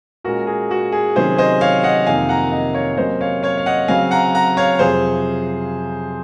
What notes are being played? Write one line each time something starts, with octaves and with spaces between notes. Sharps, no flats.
A#2 G#3 C#4 F#4 A#4
G#4
F#4
G#4
C3 D#3 F#3 C#4 G#4 C5
C5 D#5
C#5 F5
D#5 F#5
F2 C3 D#3 A#3 F5 G#5
F#5 A#5
D#5 F#5
C#5 F5
C3 F#3 A#3 C#4 C5 D#5
C#5 F5
C#5 F5
F5
D#5 F#5
C#3 F#3 C4 F5 G#5
F#5 A#5
F#5 A#5
C#5 F5
F2 C3 F#3 G#4 C5